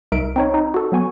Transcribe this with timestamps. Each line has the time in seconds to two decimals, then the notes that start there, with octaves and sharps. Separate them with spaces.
0.12 C2 D#4 A#4 E5 D7
0.36 C4 D#4 C#5
0.54 D#4
0.74 F#4 A4
0.92 F#3 B3 G#5 C#6